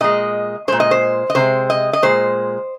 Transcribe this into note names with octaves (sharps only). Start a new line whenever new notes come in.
A#2 G#3 D#5
A#2 G#3 C5
D#5
C5
D#5
C3 G#3 C5
D#5
D#5
A#2 G#3 C5